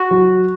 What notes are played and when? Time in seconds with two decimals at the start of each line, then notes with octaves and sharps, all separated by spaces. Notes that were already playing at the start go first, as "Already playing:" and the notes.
Already playing: F#4
0.11 F#3